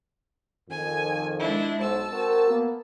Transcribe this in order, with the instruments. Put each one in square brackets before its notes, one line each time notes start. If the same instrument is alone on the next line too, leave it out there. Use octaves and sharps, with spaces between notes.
[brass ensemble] F2 D#3 [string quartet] G#5
[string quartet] G#3 D4 E4
[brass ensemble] B1 C5 [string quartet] A5 E6
[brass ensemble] C4 F#4 A#4
A#3 B3